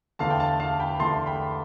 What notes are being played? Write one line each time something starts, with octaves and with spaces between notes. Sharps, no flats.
E2 D3 A3 F5 A5
G5
F5 A5
F5 A5
G5 B5
E2 D3 A3 A5 C6
G5 B5